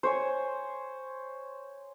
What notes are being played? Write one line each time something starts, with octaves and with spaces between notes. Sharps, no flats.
C5 C#5 G#5